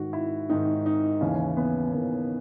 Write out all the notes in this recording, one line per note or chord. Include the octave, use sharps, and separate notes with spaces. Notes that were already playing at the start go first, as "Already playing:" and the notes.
Already playing: G#2 D#3 F#4
E4
G#2 D#3 D#4
D#4
D#2 C#3 E3 C#4
B3
D#2 C#3 E3 A#3